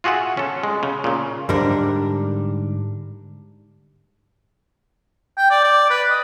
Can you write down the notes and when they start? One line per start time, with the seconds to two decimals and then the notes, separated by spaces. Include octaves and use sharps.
0.04 F4 F#4 G#4 E5 F#5
0.37 C#4 A4
0.63 G#3
0.83 C#3
1.04 A#2 C#3
1.49 G#2 D3 G3 D4 A#4
5.38 G5
5.51 D5
5.64 D5
5.90 B4
6.10 D#5